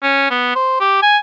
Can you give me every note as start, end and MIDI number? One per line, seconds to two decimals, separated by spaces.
0.03 0.26 61
0.30 0.53 59
0.55 0.78 72
0.80 1.00 67
1.02 1.18 80